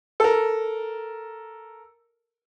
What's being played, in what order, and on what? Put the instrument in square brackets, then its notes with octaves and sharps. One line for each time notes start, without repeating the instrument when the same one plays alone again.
[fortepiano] A4 A#4